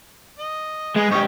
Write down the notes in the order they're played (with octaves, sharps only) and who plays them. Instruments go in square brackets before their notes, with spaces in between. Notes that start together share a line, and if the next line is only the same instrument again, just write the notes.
[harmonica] D#5
[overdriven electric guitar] G#3 [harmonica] G#4 B4
[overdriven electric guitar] G#2 G4 [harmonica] C#4 D#4 C#5